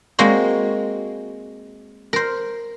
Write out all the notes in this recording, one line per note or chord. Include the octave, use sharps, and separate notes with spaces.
G#3 A#3 C4 F#4
A#4 C5